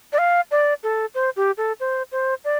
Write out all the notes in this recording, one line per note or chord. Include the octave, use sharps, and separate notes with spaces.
D5
F5
D5
A4
C5
G4
A4
C5
C5
D5